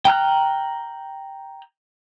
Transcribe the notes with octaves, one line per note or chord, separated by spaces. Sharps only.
G5 A#5 F6 F#6